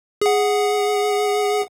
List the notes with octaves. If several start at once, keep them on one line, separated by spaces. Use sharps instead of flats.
G#4 F#5